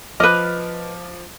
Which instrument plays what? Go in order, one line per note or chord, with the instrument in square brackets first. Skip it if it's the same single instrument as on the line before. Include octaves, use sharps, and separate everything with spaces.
[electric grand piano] F3 D6 F6 [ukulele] B4 D#5